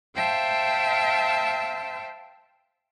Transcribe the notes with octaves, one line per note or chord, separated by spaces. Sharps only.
C5 E5 F5 G5 A5